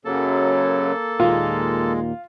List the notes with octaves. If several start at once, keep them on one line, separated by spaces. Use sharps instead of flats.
F#2 C#3 F#3 A#3 A4 A5
D#2 A#2 G#3 F4